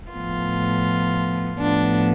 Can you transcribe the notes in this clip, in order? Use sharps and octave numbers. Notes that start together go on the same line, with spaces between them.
A2 F3 B3 F4
A2 F3 B3 D4